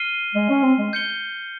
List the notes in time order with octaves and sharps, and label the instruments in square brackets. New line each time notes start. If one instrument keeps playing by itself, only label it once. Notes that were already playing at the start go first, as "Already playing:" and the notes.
Already playing: [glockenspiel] F6 C7 D#7 G7
[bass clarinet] G#3
C#4
C4
G#3
[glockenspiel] G6 C#7 G7